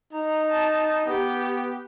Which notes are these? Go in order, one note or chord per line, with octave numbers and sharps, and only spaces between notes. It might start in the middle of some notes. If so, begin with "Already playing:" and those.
D#4 A#5
A5
B3 G4